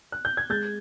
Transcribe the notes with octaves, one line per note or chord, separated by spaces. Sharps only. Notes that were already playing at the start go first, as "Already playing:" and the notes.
F#6
G6
G#6
G#3 G6 A6